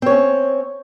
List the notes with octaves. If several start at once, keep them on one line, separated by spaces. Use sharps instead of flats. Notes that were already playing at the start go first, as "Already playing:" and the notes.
C4 C#4 C#5